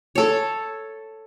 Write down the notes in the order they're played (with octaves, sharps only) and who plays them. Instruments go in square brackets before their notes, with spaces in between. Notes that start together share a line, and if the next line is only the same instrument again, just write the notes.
[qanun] A4 C#5